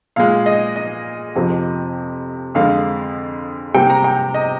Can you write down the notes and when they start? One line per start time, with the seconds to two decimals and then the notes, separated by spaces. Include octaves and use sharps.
0.16 A#2 G#3 F5
0.46 D#5
0.76 D#5
1.35 F2 C3 F3
2.55 F2 D3 G#3 F5
3.74 C3 G3 A#3 G5
3.90 A#5
4.04 G5
4.34 D#5